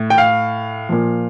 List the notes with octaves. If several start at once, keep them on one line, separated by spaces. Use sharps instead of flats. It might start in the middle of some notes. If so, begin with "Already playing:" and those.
Already playing: A2
G5
F5
A#2 F3